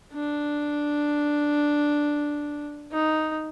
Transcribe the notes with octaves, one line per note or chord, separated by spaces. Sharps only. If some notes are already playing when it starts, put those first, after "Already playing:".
D4
D#4